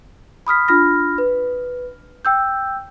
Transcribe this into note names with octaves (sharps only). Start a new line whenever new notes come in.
B5 D#6 F6 B6
D4 F4 B5 F6 A#6
B4
G5 E6 G6